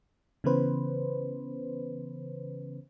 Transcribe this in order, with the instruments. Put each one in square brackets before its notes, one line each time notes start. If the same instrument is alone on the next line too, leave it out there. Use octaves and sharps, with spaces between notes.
[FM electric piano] C#3 E3 B3 C#4 B4 C5